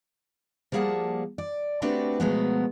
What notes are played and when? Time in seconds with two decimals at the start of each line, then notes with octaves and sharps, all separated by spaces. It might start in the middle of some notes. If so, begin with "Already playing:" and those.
0.72 F3 G3 A#3 G#4 F#5 A5
1.38 D5
1.82 A3 C4 D4 F#4 G4 B4
2.20 B2 F3 F#3 G#3 A3 B3